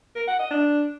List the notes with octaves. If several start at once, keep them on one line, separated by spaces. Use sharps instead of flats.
A#4
F#5
D#5
D4